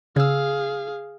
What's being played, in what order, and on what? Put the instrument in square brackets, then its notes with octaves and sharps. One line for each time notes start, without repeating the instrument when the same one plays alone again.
[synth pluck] C#3 E6 [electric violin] G#4 F5